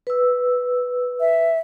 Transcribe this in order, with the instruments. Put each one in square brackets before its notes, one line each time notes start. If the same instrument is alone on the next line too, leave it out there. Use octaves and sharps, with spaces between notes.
[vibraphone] B4 E6
[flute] E5